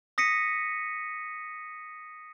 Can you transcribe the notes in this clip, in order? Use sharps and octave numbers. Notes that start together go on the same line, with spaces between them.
D#6 A#6 B6 C#7 D#7